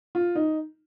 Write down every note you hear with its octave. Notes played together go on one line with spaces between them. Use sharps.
F4
D#4